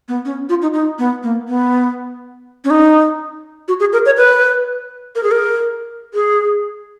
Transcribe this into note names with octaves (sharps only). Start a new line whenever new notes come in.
B3
C#4
F4
D#4
D#4
B3
A#3
B3
C#4
D#4
F#4
G#4
A#4
C#5
B4
A#4
G#4
A#4
G#4